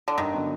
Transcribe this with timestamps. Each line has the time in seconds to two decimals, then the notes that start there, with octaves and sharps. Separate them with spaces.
0.08 D3
0.18 G2 D#3
0.33 D3 F#3 B3